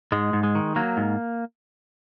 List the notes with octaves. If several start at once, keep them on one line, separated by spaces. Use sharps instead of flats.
G#2 G#3
G#2
G#3
D#3
F#3 A#3
G#2